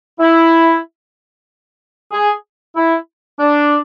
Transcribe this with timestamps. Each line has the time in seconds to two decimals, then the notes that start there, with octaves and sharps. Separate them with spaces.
0.20 E4
2.13 G#4
2.76 E4
3.40 D4